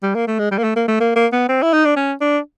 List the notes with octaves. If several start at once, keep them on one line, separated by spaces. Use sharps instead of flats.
G3
A#3
A3
G#3
G3
A#3
A3
A#3
A3
A#3
A#3
B3
C4
E4
D#4
D4
C#4
D4